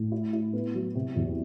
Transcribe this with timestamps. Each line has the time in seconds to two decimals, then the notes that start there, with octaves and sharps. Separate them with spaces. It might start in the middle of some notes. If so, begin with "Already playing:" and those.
Already playing: A2
0.12 E4
0.33 E4
0.53 B3
0.75 F#3
0.95 C3
1.16 E2